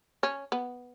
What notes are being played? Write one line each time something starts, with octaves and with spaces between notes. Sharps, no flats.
C#4
B3